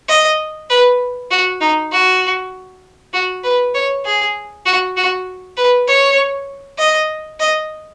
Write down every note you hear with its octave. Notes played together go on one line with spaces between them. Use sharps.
D#5
B4
F#4
D#4
F#4
F#4
B4
C#5
G#4
F#4
F#4
B4
C#5
D#5
D#5